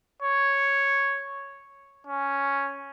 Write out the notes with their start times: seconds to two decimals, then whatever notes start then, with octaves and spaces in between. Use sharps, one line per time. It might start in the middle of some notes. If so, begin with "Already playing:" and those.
0.22 C#5
2.07 C#4